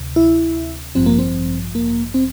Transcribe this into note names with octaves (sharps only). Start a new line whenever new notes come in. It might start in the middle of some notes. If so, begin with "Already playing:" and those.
Already playing: D2 C3
E4
A1 G2 F3 C4
A#3
C4
A#3
C4